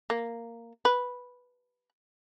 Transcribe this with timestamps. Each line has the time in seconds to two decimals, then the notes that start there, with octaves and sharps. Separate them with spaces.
0.10 A#3
0.85 B4